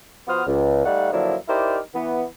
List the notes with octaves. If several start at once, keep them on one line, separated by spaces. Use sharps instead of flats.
F3 B3 F#4 C5 D#6 F6
C#2
G3 A3 D#4 D5 F5 F#5
D3 F3 F#3 A#3 D4 E4
D#4 E4 G4 A#4 C5 D5
E3 B3